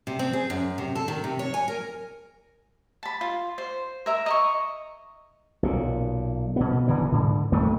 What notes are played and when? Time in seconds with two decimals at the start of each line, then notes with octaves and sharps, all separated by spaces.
0.07 C3
0.19 C4
0.33 G#4
0.50 F#2
0.78 C3
0.95 A4
1.08 D#3
1.24 C3
1.39 C#5
1.54 G#5
1.68 A#4
3.03 A5 B5
3.21 F4
3.58 C5
4.06 A#4 E5 A#5
4.26 D#5 A#5 C#6
5.63 B1 A#2
6.56 B2 B3
6.88 D#1 D3 E3 B3
7.12 G#2 D3
7.52 F#2 D#3 A3 A#3